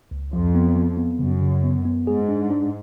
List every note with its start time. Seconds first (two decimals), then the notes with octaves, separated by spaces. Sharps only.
0.11 C#2
0.32 F2 F3
0.55 B3
0.76 F3
0.97 B3
1.19 F#2 C#3
1.42 C#3
1.64 B3
1.85 B3
2.07 G#2 G#4
2.29 D4
2.51 D4